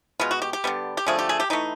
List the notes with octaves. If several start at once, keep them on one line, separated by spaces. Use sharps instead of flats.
B2 G#3 B3 F4
F#4
G4
G4
D3 G3 B3
G4
D3 F3 A3 G#4
G4
G#4
G4
E3 A3 D#4